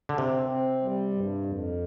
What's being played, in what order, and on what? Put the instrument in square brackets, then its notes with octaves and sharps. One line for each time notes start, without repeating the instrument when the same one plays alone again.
[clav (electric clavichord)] D3
[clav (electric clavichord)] C3 [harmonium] C4
[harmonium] C4
G3
G2
F2